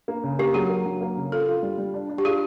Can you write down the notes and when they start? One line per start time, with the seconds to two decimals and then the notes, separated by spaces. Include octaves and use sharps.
0.08 A#3
0.24 C#3
0.39 A#3 G4
0.54 F#3 G#4
0.70 A#3
0.86 F#3
1.01 A#3
1.17 C#3
1.32 F4 A4
1.48 F4
1.63 G3
1.78 G3
1.94 D4
2.09 D4
2.18 G4
2.25 F4 G#4